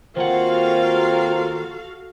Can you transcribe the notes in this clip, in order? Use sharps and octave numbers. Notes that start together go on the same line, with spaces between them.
D#3 A#3 C4 F4 F#4 A4 F5 F#5